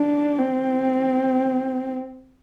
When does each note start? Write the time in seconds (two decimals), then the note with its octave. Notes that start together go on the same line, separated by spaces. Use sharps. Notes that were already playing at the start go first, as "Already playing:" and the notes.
Already playing: D4
0.39 C4